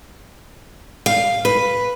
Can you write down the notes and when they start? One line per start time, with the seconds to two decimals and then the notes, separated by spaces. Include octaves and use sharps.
1.06 F5
1.45 B4